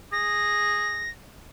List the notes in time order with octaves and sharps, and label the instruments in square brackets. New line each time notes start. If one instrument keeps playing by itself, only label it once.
[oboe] G#4 [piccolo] A#6